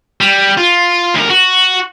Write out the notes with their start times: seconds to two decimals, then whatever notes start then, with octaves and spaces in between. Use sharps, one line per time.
0.21 G3
0.58 F4
1.15 D2 A#4
1.30 F#4